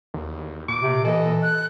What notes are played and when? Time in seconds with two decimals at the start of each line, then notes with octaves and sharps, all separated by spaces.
0.14 D#2
0.68 A#2 D6
0.82 C3
1.04 E3 A4 D#5
1.42 F#6